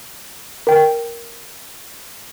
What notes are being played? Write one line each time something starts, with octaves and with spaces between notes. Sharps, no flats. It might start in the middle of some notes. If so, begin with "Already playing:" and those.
A#4 G5